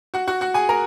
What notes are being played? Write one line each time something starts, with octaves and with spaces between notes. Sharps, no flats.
F#4 F#5
F#4 F#5
F#4 F#5
G#4 G#5
A#4 A#5